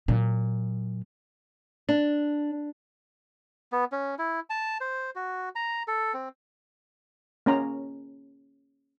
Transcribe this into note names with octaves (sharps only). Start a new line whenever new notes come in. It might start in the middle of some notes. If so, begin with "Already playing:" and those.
A#2 F#3
D4
B3
C#4
E4
A5
C5
F#4
A#5
A4
C4
A#3 C#4 A#5